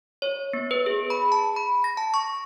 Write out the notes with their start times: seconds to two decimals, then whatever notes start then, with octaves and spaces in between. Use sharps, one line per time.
0.22 C#5
0.53 B3
0.71 B4
0.86 G#4
1.10 B5
1.32 A5
1.56 B5
1.84 A#6
1.97 A5
2.14 C#6